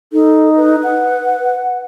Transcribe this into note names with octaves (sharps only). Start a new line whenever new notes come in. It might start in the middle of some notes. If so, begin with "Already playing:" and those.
D#4 A4
B4
F#5